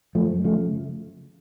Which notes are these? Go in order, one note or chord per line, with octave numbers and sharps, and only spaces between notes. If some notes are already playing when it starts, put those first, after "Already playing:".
F#2 F3 A3
C#3 F3 A3